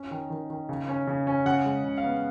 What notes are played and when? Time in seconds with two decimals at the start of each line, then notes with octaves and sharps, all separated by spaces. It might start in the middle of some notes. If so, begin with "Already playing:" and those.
Already playing: C#4
0.11 D#3
0.30 D#3
0.50 D#3
0.69 C#3
0.89 C#4
1.07 C#3
1.27 C#4
1.45 C#3 F#5
1.66 G#3
1.84 C#3
1.98 F5
2.04 B3